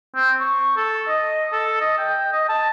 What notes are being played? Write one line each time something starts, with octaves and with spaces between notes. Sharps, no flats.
C4
C#6
A4
D#5
A4
D#5
G5
D#5
A5